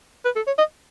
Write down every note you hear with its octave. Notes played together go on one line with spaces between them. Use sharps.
B4
A4
C#5
D#5